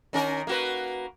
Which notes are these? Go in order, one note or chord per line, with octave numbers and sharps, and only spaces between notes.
D#3 C#4 A#4
A#3 F#4 B4